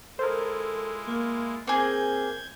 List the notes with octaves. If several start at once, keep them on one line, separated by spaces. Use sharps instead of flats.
G#3 E4 F4 A4 A#4 C5
A#3
A#3 C4 G#4 G6 G#6